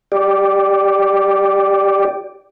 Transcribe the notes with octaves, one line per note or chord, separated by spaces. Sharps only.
G4 D5